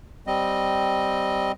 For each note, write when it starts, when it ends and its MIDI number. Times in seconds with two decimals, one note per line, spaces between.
0.27 1.52 55
0.27 1.52 60
0.27 1.52 75